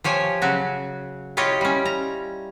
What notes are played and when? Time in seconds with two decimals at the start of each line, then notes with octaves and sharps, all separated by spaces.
0.04 F3 G4 C#5 G#5
0.42 C#3 F#3 F#4
1.37 E4 F4 G4 C#5 D#5
1.61 G3 C#4
1.85 A#5